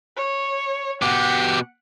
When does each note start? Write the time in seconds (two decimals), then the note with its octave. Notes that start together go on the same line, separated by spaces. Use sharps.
0.17 C#5
1.02 B2 G4 F#5